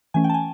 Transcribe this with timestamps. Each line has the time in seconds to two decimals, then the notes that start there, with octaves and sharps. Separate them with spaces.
0.14 E3 A3 C#4 G#5
0.24 G5
0.30 A5
0.34 G#5